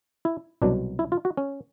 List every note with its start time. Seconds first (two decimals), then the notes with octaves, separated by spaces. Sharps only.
0.25 E4
0.62 C2 B2 F#3 D4
0.99 E4
1.12 F4
1.25 F#4
1.37 C#4